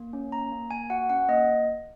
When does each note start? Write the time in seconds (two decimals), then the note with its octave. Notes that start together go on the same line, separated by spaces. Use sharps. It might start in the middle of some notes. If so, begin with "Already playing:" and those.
Already playing: A#3
0.13 C#4
0.32 A#3 A#5
0.52 A#3
0.71 A#3 G#5
0.90 F#4 F#5
1.09 C#4 F#5
1.28 A#3 D#5